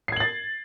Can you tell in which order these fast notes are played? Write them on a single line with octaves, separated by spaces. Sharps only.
C7 G#6 F#7 A6